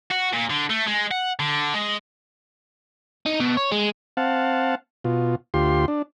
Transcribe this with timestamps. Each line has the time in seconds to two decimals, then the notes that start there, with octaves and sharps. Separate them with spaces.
0.11 F#4
0.33 A#2
0.50 D3
0.70 A3
0.88 G#3
1.11 F#5
1.40 D3
1.74 G#3
3.26 D#4
3.40 B2
3.57 C#5
3.72 G#3
4.17 C4 F5 F#5 A5
5.05 B2 F4
5.54 D2 F4 G4 C6
5.88 D4